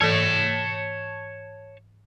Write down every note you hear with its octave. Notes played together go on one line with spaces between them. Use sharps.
G#2 E3 A4 C#5 A5